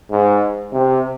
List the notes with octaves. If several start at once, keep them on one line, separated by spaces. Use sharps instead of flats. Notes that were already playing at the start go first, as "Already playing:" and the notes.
G#2
C3